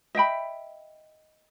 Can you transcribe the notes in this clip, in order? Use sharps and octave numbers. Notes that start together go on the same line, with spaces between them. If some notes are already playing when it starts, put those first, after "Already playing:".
D#5 E5 G5 B5